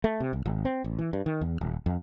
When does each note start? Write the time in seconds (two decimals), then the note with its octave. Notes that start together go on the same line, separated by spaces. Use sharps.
0.04 A3
0.20 C3
0.33 C2
0.46 G#1
0.65 C4
0.84 A1
0.99 E3
1.13 G2
1.26 D#3
1.41 E2
1.61 D#1
1.86 F2